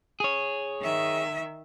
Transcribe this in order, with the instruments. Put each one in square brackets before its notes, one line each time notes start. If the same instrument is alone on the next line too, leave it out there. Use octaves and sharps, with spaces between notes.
[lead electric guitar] G#4 C#5
[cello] D#3 E5